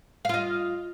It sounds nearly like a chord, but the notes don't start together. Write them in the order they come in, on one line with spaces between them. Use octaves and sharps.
F5 F4 D#5